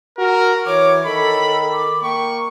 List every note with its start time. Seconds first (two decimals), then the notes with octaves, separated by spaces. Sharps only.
0.19 F#4 A#4
0.67 E3 C#5 D6
1.05 D#3 A4 B5
1.73 D6
2.03 A#3 G5 C#6